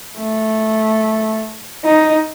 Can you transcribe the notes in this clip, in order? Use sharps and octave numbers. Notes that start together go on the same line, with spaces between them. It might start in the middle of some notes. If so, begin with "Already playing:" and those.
A3
D#4